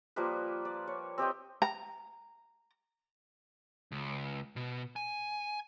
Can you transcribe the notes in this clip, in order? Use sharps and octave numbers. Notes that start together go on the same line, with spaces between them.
F3 G3 A#3 B4
D5
C#5
C4 G4 D#5 G5
A#5
C#2
B2
G#5